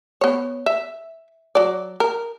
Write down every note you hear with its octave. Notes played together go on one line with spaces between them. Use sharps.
B3 C#5
E5
F#3 D5
A#4